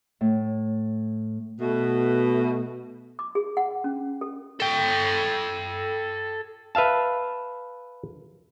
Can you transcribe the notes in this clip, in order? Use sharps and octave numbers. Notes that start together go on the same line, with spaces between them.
A2
B2 A3
D6
G#4
F#5
C#4
A4
A4 G5
B4 E5 F5 A5